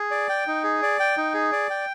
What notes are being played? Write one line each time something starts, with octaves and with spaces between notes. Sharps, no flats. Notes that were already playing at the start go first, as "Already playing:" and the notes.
Already playing: G#4
D5
G5
D#4
G#4
D5
G5
D#4
G#4
D5
G5